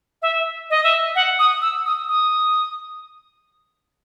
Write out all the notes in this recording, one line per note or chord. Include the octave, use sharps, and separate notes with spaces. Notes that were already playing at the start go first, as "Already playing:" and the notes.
E5
D#5
E5
F#5
D#6
E6
D#6
D#6